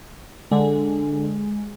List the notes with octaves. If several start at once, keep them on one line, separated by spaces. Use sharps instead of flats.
D3 G#3